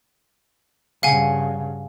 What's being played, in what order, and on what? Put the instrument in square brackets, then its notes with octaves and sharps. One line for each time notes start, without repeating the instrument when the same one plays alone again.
[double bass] G2 C#3 [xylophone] F5 F#5 G#5